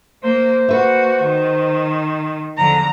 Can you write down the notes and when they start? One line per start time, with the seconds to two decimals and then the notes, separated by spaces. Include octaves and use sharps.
0.23 A#3 C5
0.69 A#3 F#4 B4 E5
1.22 D#3
2.58 E2 D3 F3 A#5